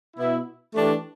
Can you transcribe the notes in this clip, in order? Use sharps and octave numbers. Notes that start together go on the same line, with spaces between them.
B2 B3 E4
E3 A3 D4 G4